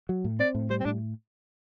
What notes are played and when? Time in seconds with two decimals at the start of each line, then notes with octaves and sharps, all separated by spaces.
0.09 F#3
0.24 A2
0.39 C4 D5
0.55 A2
0.70 G3 C5
0.80 C4
0.85 A2 D4